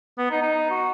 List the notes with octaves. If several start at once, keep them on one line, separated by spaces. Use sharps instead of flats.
B3
D#4
D#4
F#4